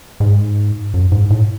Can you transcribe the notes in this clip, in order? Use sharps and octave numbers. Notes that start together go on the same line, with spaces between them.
G#2
F#2
G#2
A2